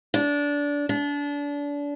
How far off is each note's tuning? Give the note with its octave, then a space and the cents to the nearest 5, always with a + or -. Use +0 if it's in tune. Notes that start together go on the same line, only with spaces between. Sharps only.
D4 -20
D4 -30